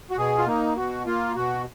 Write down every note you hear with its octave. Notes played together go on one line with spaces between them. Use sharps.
F#4
B2 G#4
F4
A#3 D#4
B2 F#4
A#3 F4
B2 F#4